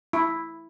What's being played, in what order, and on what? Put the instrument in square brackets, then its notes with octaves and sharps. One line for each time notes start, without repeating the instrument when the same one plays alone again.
[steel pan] E4